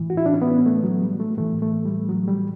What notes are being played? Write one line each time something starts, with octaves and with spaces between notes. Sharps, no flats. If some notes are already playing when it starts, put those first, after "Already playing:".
Already playing: A2 E3
F#4
E4
D4
C#4
B3
A3
F#3
G3
A3
A2 E3 A3
A3
G3
F#3
G3